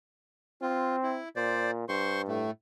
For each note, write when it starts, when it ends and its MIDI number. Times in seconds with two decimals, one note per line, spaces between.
0.62 1.19 60
0.62 0.96 65
1.03 1.29 64
1.36 1.84 46
1.36 1.71 72
1.36 1.71 74
1.89 2.47 43
1.89 2.22 72
1.89 2.22 84
1.89 2.22 85
2.28 2.51 45
2.28 2.51 57